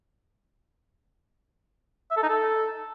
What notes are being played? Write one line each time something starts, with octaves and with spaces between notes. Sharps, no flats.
E5
A4
D#4
A4